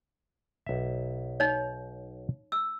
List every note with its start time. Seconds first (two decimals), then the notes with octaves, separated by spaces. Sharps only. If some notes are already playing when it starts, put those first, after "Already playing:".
0.67 B1 E5
1.40 D#4 C#5
2.52 E6